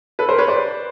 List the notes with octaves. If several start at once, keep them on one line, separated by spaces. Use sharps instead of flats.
A4 B4
A#4 C5
B4 C#5
C5 D5